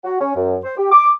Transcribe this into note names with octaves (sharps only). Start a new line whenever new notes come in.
F#4
C#4
F#2
C5
G4
D6